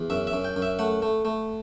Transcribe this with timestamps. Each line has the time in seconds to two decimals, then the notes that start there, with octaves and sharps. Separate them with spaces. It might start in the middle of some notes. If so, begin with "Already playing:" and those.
Already playing: E2
0.10 F#2 E5
0.27 E5
0.33 F#2
0.45 G5
0.56 F#2
0.62 E5
0.79 A3 F#5
1.02 A3
1.25 A3